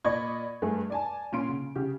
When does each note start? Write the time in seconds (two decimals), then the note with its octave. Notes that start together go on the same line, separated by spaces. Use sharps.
0.04 A#2 D5 D#5 B5 C#6 G#6
0.62 G2 A3 G#4
0.90 D5 G#5 A5
1.32 A#2 C#4 F4 C6 D7
1.49 C#3
1.75 C#3 G4